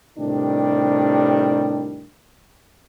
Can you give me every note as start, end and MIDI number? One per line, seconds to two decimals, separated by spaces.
0.19 2.07 45
0.19 2.07 48
0.19 2.07 51
0.19 2.07 55
0.19 2.07 62